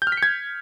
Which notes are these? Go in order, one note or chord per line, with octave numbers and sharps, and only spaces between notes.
G6
F6
B6
C#7
G#6